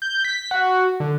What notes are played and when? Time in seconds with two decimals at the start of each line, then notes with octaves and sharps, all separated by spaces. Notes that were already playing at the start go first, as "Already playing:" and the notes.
0.02 G6
0.25 B6
0.51 F#4
1.00 D3